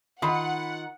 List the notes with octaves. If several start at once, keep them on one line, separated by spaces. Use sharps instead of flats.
D#3 F4 F#5 B5